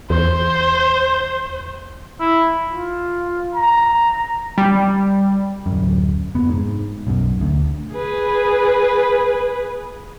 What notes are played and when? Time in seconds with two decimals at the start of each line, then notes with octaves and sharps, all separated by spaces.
0.10 E2 C5
2.20 E4
2.71 F4
3.55 A#5
4.58 G3
5.66 D1 F#2
6.35 F1 B3
6.49 G#2
7.07 B1 F#2
7.41 D2
7.93 G#4 B4